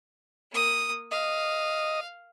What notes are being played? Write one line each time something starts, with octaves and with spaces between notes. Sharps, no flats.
A#3 D#6
D#5 F5